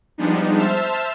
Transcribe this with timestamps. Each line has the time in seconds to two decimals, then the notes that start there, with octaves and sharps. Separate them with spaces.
0.18 F3 G3 G#3 B3 D4 D#4
0.57 C5 E5 A5 E6 F6